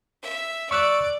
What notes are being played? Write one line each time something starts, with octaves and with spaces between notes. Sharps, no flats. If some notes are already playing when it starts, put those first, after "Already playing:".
E5
D5 C#6 E6 F#6